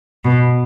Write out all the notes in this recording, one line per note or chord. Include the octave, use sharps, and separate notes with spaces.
B2